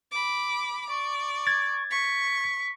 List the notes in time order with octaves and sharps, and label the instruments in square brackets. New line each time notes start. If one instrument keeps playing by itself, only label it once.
[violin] B5 D6
[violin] D5 [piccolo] C#6
[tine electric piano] G#6 A6
[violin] C#6 [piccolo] B6